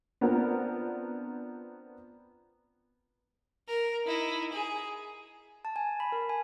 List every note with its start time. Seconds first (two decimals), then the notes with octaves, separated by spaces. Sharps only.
0.21 B3 C4 D4 F4 A#4
3.68 A#4
4.04 D#4 E4
4.52 G#4
5.65 A5
5.76 G#5
6.00 B5
6.12 A#4
6.29 G#5